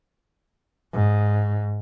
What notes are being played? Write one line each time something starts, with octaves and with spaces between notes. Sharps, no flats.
G#2